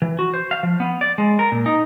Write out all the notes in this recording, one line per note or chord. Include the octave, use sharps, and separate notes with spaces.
E3
F#4
C5
F5
F3
B3
D5
G#3
A#4
A#2
D#4